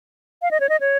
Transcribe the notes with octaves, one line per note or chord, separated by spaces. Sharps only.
F5
D#5
C#5
D#5
C#5